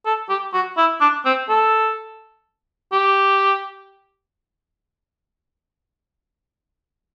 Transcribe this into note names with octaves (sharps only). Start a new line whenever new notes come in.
A4
G4
F#4
E4
D4
C4
A4
G4